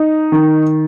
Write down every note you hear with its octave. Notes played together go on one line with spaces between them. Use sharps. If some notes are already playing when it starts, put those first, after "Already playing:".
Already playing: D#4
D#3